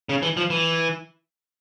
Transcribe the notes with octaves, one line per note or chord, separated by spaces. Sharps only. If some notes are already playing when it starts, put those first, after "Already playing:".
C#3
E3
F3
E3